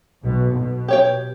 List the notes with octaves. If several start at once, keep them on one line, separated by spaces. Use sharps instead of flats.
B1 B2
B2
G4 C#5 G5